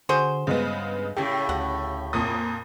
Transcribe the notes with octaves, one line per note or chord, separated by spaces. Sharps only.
D3 F#4 G#4 C5
G2 C#3 G#3 B3
A2 C#3 G4
D2 F#5
F2 A#2 D#6